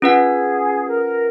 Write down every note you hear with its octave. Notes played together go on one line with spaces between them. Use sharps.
C#4 F4 G#4 B4 F#5
A#4